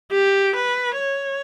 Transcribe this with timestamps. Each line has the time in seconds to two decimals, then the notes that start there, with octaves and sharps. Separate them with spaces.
0.11 G4
0.56 B4
0.99 C#5